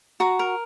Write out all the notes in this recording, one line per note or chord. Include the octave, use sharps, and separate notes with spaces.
F#4 A#5
A#4